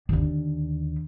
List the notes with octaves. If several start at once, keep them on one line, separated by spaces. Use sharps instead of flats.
D#2 D3